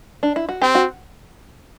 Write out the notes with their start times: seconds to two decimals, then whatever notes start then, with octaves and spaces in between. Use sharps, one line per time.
0.23 D4
0.36 E4
0.49 F#4
0.62 C4 G4
0.75 F#4